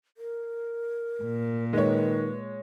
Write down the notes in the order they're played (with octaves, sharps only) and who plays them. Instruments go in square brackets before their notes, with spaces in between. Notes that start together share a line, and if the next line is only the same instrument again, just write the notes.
[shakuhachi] A#4
[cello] A#2
[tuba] D#3 [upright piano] G#3 C#5 [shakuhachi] B4